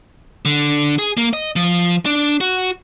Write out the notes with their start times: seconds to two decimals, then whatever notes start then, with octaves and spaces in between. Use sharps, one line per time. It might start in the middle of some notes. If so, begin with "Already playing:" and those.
0.45 D3
0.99 G#4
1.17 A#3
1.33 D#5
1.56 F3
2.06 D4
2.41 F#4